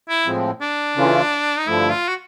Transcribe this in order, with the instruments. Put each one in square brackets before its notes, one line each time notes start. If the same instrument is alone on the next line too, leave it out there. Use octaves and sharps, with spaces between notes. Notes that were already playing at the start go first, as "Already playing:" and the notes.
[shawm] E4
[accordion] A2 F3 G#3 C4
[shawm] D4
[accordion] C#3 E3 A3 C#4 F4
[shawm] D#4
[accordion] G2 D3 F3 A3 [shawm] E4
[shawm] F4
F#4